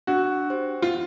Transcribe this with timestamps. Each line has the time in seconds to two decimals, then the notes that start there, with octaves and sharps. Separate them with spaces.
0.07 D4 F#4
0.50 G4 C5
0.82 F4